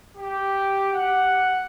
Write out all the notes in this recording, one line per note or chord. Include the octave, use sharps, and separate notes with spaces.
G4
F#5